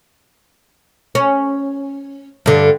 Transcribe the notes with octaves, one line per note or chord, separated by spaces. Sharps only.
C#4
G2 D3